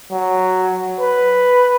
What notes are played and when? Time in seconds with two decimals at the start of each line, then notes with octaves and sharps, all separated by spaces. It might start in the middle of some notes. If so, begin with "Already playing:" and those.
0.11 F#3
1.00 B4